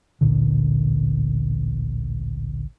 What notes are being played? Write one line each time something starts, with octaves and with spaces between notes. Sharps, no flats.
A1 D2 A#2 D3